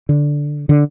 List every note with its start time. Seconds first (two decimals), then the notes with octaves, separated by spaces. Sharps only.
0.09 D3
0.69 D3